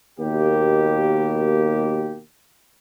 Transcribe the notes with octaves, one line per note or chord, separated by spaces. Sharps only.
D#2 B2 A#3 G4